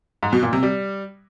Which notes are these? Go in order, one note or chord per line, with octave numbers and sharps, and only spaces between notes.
G#2
B2
A#2
C3
G3